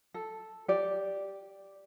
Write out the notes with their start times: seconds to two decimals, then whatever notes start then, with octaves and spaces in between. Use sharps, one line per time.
0.14 A4
0.68 G4 D5